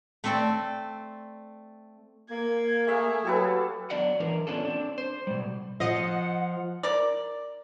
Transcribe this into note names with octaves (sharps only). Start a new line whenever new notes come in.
A3 C4 A4 D5 G5
A#3 G#6
A3 G#4 E5 F5
F#3 G4 A4 B4
F#3 B3 D4 D5 D#5 F#5
E3 D4 A#4
B3 C#4 D4 F4 A4
C4 D4
C5
B2 G3
F3 D#5 F#5
A#4 D5